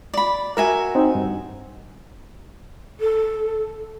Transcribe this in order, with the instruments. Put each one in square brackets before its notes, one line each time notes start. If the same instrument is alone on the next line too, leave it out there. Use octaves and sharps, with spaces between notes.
[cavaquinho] D5 B5
[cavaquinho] F#4 E5 G#5 [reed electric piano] A#4
[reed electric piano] C4 D#4
G2
[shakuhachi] A4